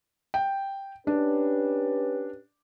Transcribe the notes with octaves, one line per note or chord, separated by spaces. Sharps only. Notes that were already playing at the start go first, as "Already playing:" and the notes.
G5
C#4 D4 G4 B4